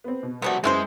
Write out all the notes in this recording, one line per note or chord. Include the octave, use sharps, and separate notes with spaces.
B3 C4
B2
C2 G3 A3 B3 F#4 C5
F#2 E3 G#3 F4 C5 E6 G6